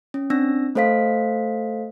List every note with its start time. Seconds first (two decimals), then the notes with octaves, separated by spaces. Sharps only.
0.14 C#4
0.30 C4 D4 E6 A#6
0.75 A3 A4 C5 F5 B6